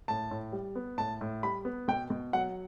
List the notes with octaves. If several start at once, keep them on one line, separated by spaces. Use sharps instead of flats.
A2 A5
A2
G3
B3
A2 A5
A2
G3 B5
B3
B2 G5
B2
F#3 F#5